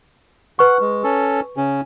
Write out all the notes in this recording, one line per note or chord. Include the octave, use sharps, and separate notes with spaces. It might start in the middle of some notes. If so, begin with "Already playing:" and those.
B4 F#5 C#6
G#3
C#4 A4
C#3 C#4